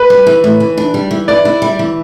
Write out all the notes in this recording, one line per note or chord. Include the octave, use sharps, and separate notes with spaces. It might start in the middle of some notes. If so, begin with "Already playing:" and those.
Already playing: B4
G3
E3
A2
E3
D4
G3
E3
B4 D5
E4
G3
E3